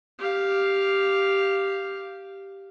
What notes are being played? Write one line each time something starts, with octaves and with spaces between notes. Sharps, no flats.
G4 F5